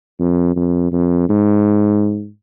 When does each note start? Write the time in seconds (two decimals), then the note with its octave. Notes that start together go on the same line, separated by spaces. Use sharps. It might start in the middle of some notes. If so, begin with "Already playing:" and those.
0.20 F2
0.56 F2
0.92 F2
1.29 G#2